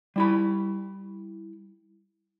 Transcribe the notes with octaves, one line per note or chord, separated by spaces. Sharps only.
G3 E4 B5